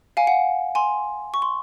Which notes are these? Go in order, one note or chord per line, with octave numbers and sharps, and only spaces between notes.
F5 G#5
F#5
G#5 C6
C#6
C6